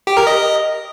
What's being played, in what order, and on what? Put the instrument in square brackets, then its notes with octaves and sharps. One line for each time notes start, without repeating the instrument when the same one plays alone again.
[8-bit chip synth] G4
A#4
D#5